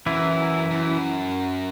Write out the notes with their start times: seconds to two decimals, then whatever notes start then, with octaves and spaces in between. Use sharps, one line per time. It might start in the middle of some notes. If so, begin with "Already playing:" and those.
0.06 F#2 E3 E4
0.71 F#2